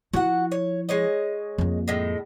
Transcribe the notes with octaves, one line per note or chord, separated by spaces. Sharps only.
F3 E4 F#4 F#5
C#5
G#3 C#5 D#5
F2 A#3
A2 G#3